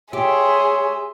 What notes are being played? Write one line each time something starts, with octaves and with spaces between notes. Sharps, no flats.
G4 G#4 C#5 E5 C6